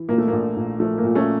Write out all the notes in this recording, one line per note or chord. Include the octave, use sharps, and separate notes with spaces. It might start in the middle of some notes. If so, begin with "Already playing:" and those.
Already playing: E3
A#2 A#3
A3
A#1 A#3
A#1
F3 A3
A#3
A#2
A3 C#4